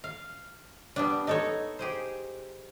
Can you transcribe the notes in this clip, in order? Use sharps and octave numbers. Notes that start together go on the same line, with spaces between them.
F5
G3 B3 D4
D#4 A4 C#5
G4 G#4 C5